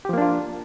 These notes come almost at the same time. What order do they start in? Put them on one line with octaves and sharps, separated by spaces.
G4 F3 A#3 D4 F4